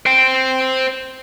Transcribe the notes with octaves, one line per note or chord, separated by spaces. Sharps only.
C5 G5